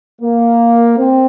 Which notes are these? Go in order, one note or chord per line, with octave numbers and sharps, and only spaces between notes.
A#3
C4